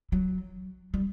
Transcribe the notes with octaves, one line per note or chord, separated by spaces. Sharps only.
F#3
G3